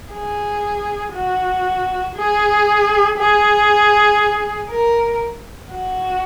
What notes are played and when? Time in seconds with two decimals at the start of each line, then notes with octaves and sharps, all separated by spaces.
0.12 G#4
1.13 F#4
2.16 G#4
3.18 G#4
4.70 A#4
5.73 F#4